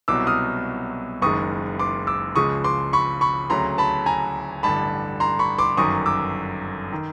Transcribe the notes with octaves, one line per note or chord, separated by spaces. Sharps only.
C2 B2 F#3 D6 E6
D#6 F6
F#1 F#2 D#3 G#3 C#6 D#6
C6 D6
D6 E6
C#2 C#3 F3 G#3 C#6 D#6
C6 D6
B5 C#6
B5 C#6
D2 C#3 F#3 A#5 C6
A5 B5
G#5 A#5
A1 G2 D3 A5 B5
A#5 C6
B5 C#6
C6 D6
G1 F#2 D#3 F#3 C#6 D#6
D6 E6
D#3